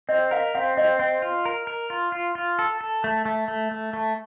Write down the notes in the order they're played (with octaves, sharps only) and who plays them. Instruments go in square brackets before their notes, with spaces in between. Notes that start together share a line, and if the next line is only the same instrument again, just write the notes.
[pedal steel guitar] C4 [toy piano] D#5
[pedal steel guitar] A#4 [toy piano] F5
[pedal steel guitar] C4 [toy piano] F5
[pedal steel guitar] C4 [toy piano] D#5
[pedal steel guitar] C4
F4
A#4
A#4
F4
F4
F4
A4
A4
A3
A3
A3
A3
A3